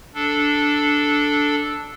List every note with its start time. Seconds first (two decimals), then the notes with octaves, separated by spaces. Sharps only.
0.14 D4 A4